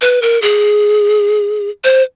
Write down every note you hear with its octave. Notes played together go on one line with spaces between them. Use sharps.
B4
A#4
G#4
C5